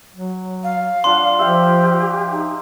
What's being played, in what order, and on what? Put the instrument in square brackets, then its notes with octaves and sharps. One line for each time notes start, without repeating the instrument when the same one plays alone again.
[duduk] F#3
[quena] F5
[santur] D4 F4 F#5 [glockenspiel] C6
[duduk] F3 [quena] G4 [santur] E5 F5
[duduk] D#4